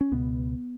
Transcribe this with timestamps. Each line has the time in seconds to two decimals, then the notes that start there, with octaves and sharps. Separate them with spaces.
0.01 C#4
0.11 C#2 B2 B3